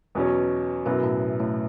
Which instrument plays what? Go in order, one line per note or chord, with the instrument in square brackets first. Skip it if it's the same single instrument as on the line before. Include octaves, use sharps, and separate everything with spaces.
[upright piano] E2 B2 F#3 C#4
[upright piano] F#2 F#3 B3 E4 [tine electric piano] B2
[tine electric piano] A2
A2